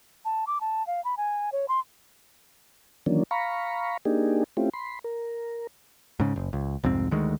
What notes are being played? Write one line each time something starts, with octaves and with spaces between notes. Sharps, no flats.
A5
D6
A5
F5
B5
G#5
C#5
C6
D#3 E3 F#3 A#3 C#4 D4
F5 A#5 B5 C#6
A#3 D4 D#4 G4 G#4
A3 C4 C#4 E4 F4 G4
B5 C6
A#4
G#2 C#3
F#1
C#2
C2 F2 G#2 C4
D2 D#3 G#3